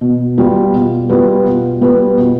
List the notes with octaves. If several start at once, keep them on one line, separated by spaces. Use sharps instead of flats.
B2
G3 B3 F4 B4
B2
G3 B3 F4 B4
B2
G3 B3 F4 B4
B2